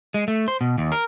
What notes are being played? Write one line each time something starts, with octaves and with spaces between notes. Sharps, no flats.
G#3
A3
C5
B2
D#2
A#4